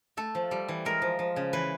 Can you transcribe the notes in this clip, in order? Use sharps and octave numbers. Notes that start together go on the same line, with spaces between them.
A3 A4
F3
G3
E3
G#3 A#4
F3
F3
C#3
E3 B4